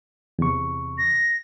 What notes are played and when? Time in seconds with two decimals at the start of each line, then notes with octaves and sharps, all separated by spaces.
0.39 E2 C3 C#6
0.98 A#6